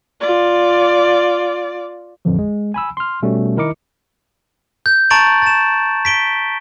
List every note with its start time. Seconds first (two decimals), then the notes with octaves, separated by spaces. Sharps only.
0.21 F4 D5
2.25 A1 F2 D3 E3 F3
2.39 G#3
2.74 G#5 B5 E6
2.97 C6 F6
3.23 B2 G3 A3 C#4
3.57 D#3 E4 A#4 D#5 D6 C#7
4.86 G6
5.10 A5 A#5 C#6 A6 D7 F#7
5.42 A6 E7
6.05 B6 D7 G7